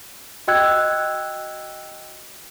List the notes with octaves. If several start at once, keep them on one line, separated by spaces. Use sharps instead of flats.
F#4 D#5 G5 E6 F#6 G#6